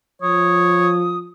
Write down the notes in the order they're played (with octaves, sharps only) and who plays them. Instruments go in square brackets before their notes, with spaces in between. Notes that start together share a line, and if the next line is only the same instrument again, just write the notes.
[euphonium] F3 [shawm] C#5 [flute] D#6